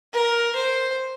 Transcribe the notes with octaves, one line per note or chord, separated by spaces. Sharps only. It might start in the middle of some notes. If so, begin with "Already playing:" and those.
A#4
C5